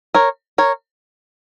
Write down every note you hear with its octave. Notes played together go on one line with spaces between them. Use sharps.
A#4 C#5
A#4 C#5